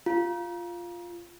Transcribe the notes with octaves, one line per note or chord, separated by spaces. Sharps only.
F4